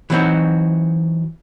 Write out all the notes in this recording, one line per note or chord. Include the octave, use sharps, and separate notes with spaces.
E3 F#3 B3 C4 D#4 F#4